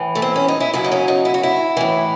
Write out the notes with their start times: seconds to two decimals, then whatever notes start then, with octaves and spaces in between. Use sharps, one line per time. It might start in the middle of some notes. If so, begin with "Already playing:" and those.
Already playing: A2 E3
0.15 A3
0.22 C4
0.36 C#4
0.48 D#4
0.60 E4
0.73 F#2 C#3 F#3 E4
0.84 D#4
0.92 C#4
1.08 D#4
1.25 E4
1.34 F#4
1.43 E4
1.77 A2 E3